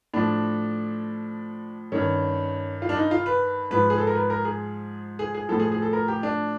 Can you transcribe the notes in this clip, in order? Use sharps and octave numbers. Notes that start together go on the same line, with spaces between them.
A2 F3 D4
G2 D#3 C#4
F4
D4
D#4
F4
B4
G#2 F3 B4
G#4
A4
A#4
B4
A#4
G#4
G#4
G#4
A2 F3 A4
G#4
G#4
A4
A#4
G4
D4